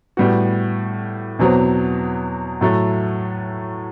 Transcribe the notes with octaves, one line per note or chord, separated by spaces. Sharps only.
A2 G3 B3 F#4
E2 B2 F#3 C4
A2 F#3 A3